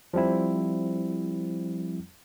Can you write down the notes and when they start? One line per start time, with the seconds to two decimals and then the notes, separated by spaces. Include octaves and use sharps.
0.14 F3 G3 C4 E4